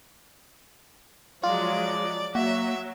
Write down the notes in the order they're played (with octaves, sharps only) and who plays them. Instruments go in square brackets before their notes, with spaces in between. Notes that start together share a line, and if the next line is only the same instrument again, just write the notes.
[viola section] F3 F#3 G#3 [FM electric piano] F4 [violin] D5 D6
[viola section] F#3 [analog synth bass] A#3 [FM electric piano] F#4 [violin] E5